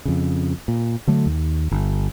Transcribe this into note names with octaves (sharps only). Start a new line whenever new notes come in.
F2 C#3
A#2
D3 F#3 A3
D#2
G1